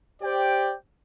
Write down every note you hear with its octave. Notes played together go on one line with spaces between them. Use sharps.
G4 C5 D5 G5